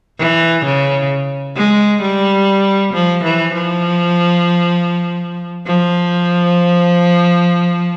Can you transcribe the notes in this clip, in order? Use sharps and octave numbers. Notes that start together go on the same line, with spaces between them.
E3
C#3
G#3
G3
F3
E3
F3
F3